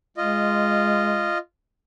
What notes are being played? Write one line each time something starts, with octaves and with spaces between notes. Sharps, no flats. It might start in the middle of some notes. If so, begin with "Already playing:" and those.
G#3 F4 D#5